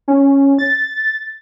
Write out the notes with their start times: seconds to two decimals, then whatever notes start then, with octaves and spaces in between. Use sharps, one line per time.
0.08 C#4
0.59 A6